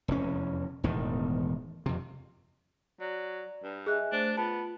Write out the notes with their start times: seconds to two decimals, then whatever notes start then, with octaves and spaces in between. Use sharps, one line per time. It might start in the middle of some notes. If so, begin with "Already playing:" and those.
0.08 F1 E2 C#4
0.84 E1 E2 A2 D#3
1.86 F2 C3
3.00 F#3 D5
3.63 G2
3.87 G#4 D#5 E5 G#5 F#6
4.12 A3 D4 C5
4.37 B3 F4 A5